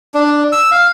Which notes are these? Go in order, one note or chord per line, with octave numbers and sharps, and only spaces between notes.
D4
E6
F5